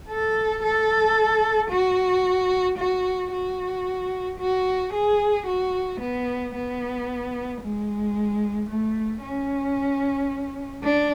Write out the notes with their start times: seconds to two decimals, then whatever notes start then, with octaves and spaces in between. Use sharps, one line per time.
0.09 A4
0.63 A4
1.70 F#4
2.78 F#4
3.32 F#4
4.39 F#4
4.93 G#4
5.46 F#4
6.00 B3
6.54 B3
7.61 G#3
8.69 A3
9.22 C#4
10.84 D4